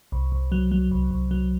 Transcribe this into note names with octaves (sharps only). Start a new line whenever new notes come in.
C2
C2
F#3
F#3
C2
C2
F#3